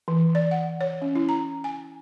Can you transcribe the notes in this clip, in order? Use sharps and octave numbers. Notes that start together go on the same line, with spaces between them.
E3
D5
F#5
C#5
C#4
E4
A#5
G#5